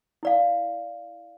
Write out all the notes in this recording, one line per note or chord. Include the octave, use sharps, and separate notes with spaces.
E4 D5 F5